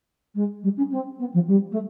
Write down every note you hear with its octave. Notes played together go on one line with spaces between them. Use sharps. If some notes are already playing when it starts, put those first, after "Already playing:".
G#3
G3
C#4
C4
B3
F3
G3
A3